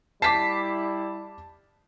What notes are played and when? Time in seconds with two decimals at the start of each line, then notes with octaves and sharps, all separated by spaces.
0.22 G3 E4 A5 D6 B6 C7